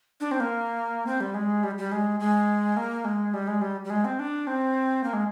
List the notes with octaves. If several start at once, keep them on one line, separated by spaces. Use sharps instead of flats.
D4
C4
A#3
C4
G3
G#3
G3
G3
G#3
G#3
A#3
G#3
G3
G#3
G3
G3
G#3
C4
D4
C4
A#3
G#3